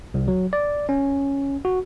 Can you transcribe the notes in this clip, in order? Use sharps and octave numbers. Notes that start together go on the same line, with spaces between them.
C2
F#3
D5
C#4
F#4